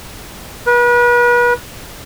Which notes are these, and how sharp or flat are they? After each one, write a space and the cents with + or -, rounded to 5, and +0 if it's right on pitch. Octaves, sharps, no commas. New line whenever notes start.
B4 -35